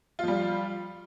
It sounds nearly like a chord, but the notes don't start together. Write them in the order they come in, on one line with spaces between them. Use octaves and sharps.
F4 F3 G3